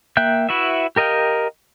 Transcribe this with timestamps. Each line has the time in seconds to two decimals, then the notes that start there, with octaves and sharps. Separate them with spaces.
0.17 A#3 E5 G5 F#6 G6
0.49 E4 F#4 B4 E5
0.96 G4 A#4 D#5 F5 G5